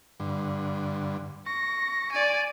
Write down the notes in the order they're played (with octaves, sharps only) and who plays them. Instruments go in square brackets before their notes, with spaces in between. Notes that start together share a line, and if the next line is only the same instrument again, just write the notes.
[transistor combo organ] G2 D3
[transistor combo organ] C#6 [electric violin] A#6
[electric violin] D5 G#5